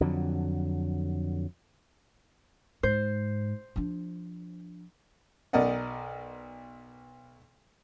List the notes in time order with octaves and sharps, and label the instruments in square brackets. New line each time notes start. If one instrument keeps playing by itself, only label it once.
[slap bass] F2 D3 F#3
[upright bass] G#2 [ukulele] C5
[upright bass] F3 D4
[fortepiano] B1 A#4 D5 D#5 F#5